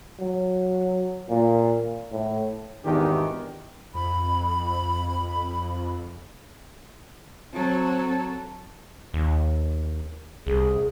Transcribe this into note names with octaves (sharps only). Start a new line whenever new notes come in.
F#3
A#2
A2
G#1 E2 D#3 D4 G4
F2 B5
F#3 C4 A4
D#2
C2 G#4